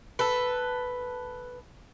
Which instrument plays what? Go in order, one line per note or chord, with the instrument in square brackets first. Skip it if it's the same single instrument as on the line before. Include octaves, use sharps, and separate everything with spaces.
[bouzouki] A4 B4